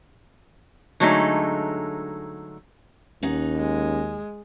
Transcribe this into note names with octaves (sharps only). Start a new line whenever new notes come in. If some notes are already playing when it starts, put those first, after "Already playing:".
D3 F#3 G#3 A3 D#4
D#2 C#4 D#4 F#5
G#3